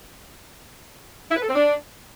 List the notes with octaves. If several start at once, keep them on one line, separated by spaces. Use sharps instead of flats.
E4
B4
A4
C4
D4